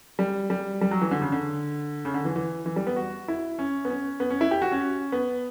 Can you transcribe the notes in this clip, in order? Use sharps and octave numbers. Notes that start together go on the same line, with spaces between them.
G3
G3
G3
F#3
E3
D3
C#3
D3
C#3
D3
E3
E3
E3
G3
B3
F#4
E4
C#4
B3
C#4
B3
C#4
E4
G4
F#4
C#4
B3